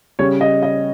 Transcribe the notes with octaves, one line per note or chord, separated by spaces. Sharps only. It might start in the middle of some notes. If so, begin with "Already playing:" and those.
C#3 G3 C#5
D#5
D#5